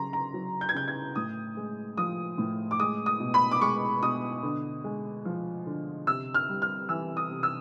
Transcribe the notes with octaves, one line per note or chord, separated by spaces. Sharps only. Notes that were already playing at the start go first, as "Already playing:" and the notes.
Already playing: C#3 F#3 A#5 C6
A#5
F#3
G6
G#6
C#3 G6
G#6
A2 D#6
G#3
F3 D#6
A2
D6
G#3 D#6
D#6
B2
B5
D6
G#3 C#6
B2 D#6
D3
G#3
F3
D3
C3 E6
F6
G3
F6
E3 E6
D#6
C3
E6